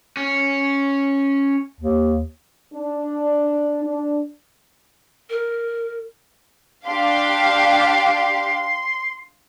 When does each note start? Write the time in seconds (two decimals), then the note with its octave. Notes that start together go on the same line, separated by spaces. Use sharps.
0.17 C#4
1.80 D#2
2.74 D4
3.84 D4
5.29 A#4
6.86 D4 G4 F5 C6